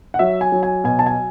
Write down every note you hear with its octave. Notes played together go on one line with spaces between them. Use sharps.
F#5
F#3 E5
G#5
F#3
G#5
B2 G#5
A5
G#5